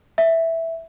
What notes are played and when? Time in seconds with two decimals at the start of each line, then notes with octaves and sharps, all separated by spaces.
0.18 E5